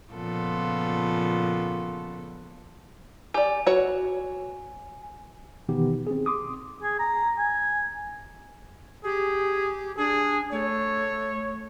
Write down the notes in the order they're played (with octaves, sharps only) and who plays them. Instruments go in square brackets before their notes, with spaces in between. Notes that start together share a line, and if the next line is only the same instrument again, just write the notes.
[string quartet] A#2 C#3 F3 B3 F4 A4
[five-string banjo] G4 D5 [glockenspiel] G#5
[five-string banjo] F#4 C#5
[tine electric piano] B2 D#3 E3 B3 D#4 G4
C4 G#4
C6 D6 D#6
[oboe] G#4
A#5
G#5
[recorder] G4 [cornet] G#4
[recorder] D4 [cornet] G#4
[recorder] A3 [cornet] C#5